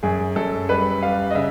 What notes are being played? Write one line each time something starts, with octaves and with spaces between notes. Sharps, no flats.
F#2 G#4
F#2 A4
G3 B4
G3 F5
D#5
C#3 E5